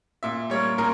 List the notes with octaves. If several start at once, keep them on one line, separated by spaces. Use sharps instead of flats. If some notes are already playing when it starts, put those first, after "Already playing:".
A#2 E5
G3 A#3 C#5
A#2 A#4